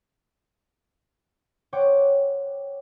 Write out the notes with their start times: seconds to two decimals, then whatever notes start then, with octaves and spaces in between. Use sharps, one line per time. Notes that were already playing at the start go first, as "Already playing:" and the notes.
1.73 C5 C#5 F#5 G5 D6